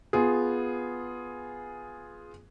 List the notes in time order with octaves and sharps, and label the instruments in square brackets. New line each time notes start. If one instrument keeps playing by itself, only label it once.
[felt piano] B3 F4 G#4